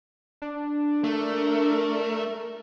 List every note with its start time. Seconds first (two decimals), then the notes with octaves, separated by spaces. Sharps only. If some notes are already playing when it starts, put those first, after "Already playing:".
0.42 D4
1.04 A3 A#4